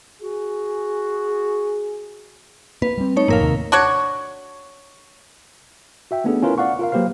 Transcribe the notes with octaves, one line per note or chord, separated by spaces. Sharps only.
F#4 G#4
A#3 B4
G3 C4
A3 D#4 C#5
F#1 A2 F3 A#3 A#4 F5
D#2 C3 D#3
D4 F#4 C#5
F#4 E5 G5
A3 B3 C#4 D4 G#4 A4
C#4 E4 F4 A#4 B4
D5 F5 F#5 C#6
F4 A#4 F5
F#3 A#3 G4 B4 C5 F5